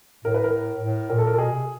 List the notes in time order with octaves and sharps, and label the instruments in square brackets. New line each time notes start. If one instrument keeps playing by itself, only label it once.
[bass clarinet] A2 [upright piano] A#4
[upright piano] B4
A#4
[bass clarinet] A2
[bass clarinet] A#2 [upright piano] A#4
[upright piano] A4
A#4
A4
[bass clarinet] B2 [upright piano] G#4
[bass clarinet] C3